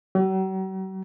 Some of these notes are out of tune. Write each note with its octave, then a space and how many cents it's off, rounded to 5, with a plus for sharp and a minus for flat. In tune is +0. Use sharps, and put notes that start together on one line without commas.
F#3 +45